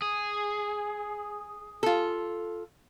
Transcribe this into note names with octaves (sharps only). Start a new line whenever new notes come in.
G#4
F4 A4